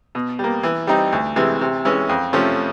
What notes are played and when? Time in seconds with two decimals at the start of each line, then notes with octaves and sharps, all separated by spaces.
0.15 B2
0.39 G3
0.44 A#3
0.63 E3
0.87 G3 C4 D#4
1.12 D2
1.36 C3 E3 G#3
1.61 C3
1.85 E3 G#3 C#4
2.09 F2
2.33 C3 F3 A3 C#4